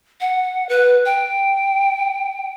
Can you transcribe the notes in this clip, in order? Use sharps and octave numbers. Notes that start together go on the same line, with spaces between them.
F#5
B4
G5